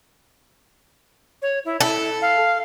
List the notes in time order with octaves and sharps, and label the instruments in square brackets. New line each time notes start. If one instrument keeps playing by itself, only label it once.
[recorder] C#5
E4
[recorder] E4 [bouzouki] A4
[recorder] F5